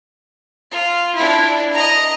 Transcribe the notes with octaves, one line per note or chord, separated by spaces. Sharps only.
F4
D4 E4
D#5 A#5